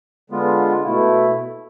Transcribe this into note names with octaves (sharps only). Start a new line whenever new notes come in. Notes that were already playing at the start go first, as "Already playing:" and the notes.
D3 G#3 B3 F4
B2 A3 E4